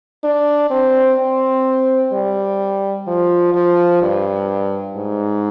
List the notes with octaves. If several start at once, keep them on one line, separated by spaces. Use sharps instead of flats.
D4
C4
C4
G3
F3
F3
G2
G#2